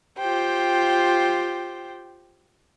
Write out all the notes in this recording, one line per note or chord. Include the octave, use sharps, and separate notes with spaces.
F4 G4 C5 G5